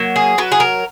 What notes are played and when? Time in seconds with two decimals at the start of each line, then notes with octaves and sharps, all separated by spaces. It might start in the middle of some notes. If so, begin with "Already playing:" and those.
Already playing: F#3 A#3
0.16 G#4
0.38 F#3 B4
0.52 G#4
0.60 A#4